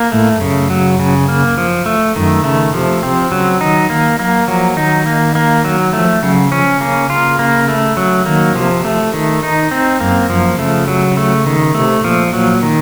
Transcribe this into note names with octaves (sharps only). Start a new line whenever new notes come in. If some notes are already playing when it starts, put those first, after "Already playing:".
Already playing: A#3
A2 A3
F#2 C#3
F#3
C#3
A#3
F3
A3
F#2 D#3
C#3 A3
C3 F3
C3 C4
C#3 F#3
D#3 D#4
D#3 A#3
F#3 A#3
F3 F#3
D#3 D#4
A#3
A#3
F#3
F3 A3
C#3 F#3
F3 C#4
C#3 A#3
F4
A#3
A3
F#3
D#3 A#3
C3 F3
A3
D#3
D#4
C4
F#2 A#3
F#2 F3
C#3 A3
F#3
A3
D#3
C3 A3
A#2 F3
A#2 F#3
D#3